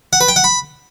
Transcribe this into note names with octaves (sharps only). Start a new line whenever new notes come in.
F#5
B4
G5
F#5
B5